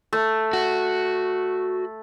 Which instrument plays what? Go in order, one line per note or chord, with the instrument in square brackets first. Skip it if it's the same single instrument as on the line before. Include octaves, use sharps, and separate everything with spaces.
[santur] A3
[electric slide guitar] F#4